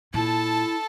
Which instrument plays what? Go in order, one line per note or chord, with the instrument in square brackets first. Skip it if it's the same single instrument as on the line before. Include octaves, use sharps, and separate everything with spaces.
[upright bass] A#2 [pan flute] E4 [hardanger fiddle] A4 A5